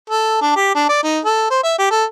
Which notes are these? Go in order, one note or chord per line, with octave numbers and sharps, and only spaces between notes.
A4
D4
G4
D4
D5
D#4
A4
C5
E5
G4
A4